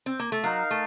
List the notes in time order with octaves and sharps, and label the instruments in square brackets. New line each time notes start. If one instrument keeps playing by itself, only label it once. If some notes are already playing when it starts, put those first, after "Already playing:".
[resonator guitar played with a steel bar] C4
A#3
A3
[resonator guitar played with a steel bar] F#3 [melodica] D#4 A#4 F5
[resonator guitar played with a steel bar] A3